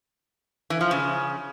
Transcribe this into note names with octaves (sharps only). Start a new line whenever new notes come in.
E3
F3
C#3